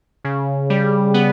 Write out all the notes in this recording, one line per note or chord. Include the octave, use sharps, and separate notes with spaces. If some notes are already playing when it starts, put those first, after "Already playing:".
C#3
G3
B3